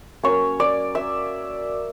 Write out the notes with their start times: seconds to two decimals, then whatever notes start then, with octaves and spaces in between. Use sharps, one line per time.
0.23 F#3 A#3 C#4 C#5
0.60 D5
0.95 E5